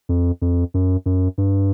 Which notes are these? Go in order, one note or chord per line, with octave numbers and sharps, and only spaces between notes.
F2
F2
F#2
F#2
G2